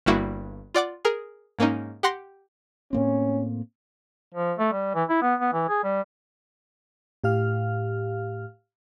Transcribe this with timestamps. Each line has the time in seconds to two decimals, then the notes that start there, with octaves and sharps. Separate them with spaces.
0.06 G1 G2 G3 A#3 E4 F#4
0.74 F4 D5 F#5 D6
1.05 G#4 A#4
1.59 G#2 A#3 C#4 D#4
2.03 G4 F#5 C6 A#6
2.93 A2 A#3 C4 C#4
4.35 F3
4.59 A3
4.73 G3
4.95 E3
5.09 E4
5.22 B3
5.40 B3
5.53 E3
5.69 G#4
5.84 G3
7.24 A2 G4 F5 F6